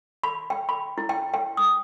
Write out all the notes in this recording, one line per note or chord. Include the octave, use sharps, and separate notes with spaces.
B5
G5
B5
E4
G5
G5
D#6